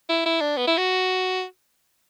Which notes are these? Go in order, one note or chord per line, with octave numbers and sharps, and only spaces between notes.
E4
E4
D4
B3
E4
F#4